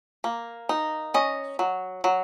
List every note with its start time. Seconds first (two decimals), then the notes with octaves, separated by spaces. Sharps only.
0.24 A#3
0.69 D#4
1.14 C#4 D#5
1.59 F#3
2.04 F#3